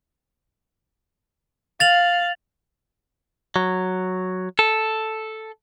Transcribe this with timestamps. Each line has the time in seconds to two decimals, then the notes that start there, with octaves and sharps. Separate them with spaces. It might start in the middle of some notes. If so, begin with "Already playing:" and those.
1.80 F5 A6 F7 F#7
3.56 F#3
4.59 A4